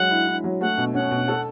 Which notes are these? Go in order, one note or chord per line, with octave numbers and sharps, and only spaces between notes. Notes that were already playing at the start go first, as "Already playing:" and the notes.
Already playing: F#3 G#3 F#5
E4
E4
F#3
A3 F#5
B2
C#4 F#5
B2
A4